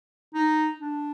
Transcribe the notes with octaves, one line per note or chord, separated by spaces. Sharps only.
D#4
D4